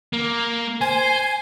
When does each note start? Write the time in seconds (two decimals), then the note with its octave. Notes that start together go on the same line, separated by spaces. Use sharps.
0.13 A#3
0.81 C5 G#5